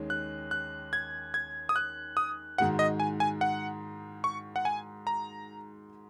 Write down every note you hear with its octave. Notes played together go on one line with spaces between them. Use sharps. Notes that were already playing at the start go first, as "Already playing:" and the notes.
Already playing: D#2 D#3 G#3 C#4
F#6
F#6
G#6
G#6
D#6
F#6
D#6
G#2 D#3 G#3 F#4 F#5
D#5
G#5
G#5
F#5
C#6
F#5
G#5
A#5